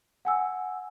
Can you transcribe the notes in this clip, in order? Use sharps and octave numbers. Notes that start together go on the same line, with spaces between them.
F#5 G#5 E6